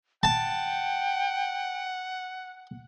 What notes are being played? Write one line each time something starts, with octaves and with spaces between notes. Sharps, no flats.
F#5 G5 A5